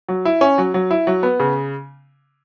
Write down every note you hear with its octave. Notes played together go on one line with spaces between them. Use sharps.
F#3
E4
C#4
F#3
F#3
E4
F#3
B3
C#3